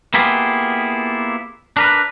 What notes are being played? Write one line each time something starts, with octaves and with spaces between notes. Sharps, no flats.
A#3 B3 E4 F4 G4 G#4
D4 A#4 B4